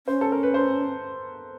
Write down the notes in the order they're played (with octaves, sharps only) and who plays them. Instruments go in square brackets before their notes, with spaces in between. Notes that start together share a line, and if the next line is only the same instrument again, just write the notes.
[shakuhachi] C#4 [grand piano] C5
[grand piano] A4
A#4
B4
C5